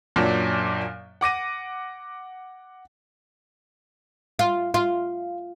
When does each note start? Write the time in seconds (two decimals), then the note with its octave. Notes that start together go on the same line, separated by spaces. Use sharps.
0.16 F#2 A#2 F#3 D4
1.21 F#5 D6 A#6 D#7
4.39 F4
4.74 F4